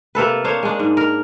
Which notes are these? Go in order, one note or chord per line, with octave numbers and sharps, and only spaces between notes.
C3 A#3 A4 B4
A#3 D4 C5 C#5
G#3 D4
G#2
A#4